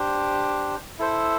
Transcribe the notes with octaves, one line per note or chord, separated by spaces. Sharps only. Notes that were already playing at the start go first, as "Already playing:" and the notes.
Already playing: D4 G4 C5
E4 A4 C5